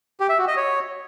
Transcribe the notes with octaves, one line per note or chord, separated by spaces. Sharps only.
G4
E5
F#4
D#5
C#5